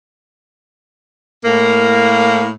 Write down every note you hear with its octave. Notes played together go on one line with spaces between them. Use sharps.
A2 A#3